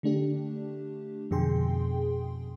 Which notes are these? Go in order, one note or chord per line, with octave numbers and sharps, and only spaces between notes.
D3 A3 D4 G4
F2 B2 D3 G#4 G5 C6